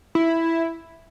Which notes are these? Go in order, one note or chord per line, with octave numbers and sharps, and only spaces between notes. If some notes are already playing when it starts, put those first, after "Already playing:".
E4